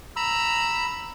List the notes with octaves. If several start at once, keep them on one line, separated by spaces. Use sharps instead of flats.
A#5 B5 E6